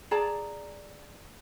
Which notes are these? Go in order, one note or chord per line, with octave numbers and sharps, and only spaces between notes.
G#4 D5 A5 A#5